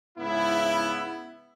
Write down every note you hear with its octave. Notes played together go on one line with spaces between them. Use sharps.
G#2 C#3 B3 E4